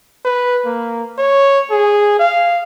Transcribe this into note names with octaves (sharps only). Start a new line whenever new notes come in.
B4
A#3
C#5
G#4
F5